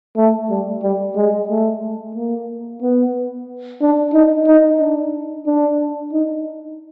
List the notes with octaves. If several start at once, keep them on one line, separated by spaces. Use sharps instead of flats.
A3
G3
G3
G#3
A3
A#3
B3
D4
D#4
D#4
D4
D4
D#4